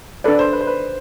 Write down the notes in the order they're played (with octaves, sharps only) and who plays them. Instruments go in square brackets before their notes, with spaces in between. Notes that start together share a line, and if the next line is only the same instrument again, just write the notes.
[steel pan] D4 A4 D5 [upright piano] B4
[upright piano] C5
B4
C5
B4